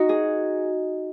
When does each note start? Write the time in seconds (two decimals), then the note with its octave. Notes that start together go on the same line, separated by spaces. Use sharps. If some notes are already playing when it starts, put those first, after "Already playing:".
Already playing: D#4 F#4
0.09 G#4